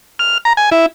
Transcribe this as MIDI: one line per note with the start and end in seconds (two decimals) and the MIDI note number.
0.19 0.38 89
0.45 0.53 82
0.57 0.70 80
0.72 0.86 64